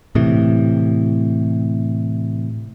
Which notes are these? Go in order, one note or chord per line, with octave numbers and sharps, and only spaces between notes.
A2 C3 E3